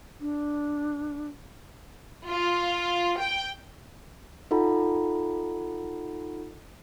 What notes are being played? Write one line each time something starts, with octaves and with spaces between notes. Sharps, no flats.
D4
F4
G5
D#4 F4 A4 F#5 A#5 B5